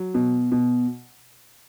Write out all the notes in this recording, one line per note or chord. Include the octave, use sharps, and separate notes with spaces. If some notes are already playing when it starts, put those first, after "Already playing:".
Already playing: F#3
B2
B2